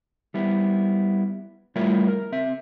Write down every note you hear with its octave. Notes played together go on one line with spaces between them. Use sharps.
G3 B3 E4
G3 A3 E4 F4 A#4 C#5
A#4
C4 E5